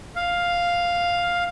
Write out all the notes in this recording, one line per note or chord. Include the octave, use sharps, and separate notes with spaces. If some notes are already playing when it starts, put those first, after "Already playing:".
F5